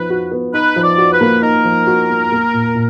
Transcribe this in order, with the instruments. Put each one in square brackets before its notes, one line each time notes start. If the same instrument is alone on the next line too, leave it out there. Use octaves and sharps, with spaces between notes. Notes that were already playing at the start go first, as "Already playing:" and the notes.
Already playing: [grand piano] F3 B3 D#4 [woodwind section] B4
[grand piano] F#4
B3
[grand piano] D#4 [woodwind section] B4
[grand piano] F3
[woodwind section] D5
[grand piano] F#4
[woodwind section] B4
[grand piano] A#3
[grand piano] D#4 [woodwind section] A#4
[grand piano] F3
F#4
A#3
A#3
A#2
A#2